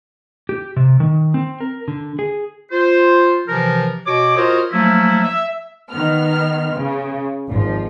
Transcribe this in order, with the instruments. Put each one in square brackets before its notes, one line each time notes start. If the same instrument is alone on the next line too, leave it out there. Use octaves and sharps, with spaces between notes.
[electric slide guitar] G4
C3
D#3
C4
A#4
D3
G#4
[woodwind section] F4 C5
C3 E3 F3 A#4
B2 F#4 C#5 D6
F4 F#4 A#4 C5 C#5 D#5
F3 F#3 A3 A#3 C#4 E4
E5
[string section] D#3 B3 F6
C#3
G#1 F3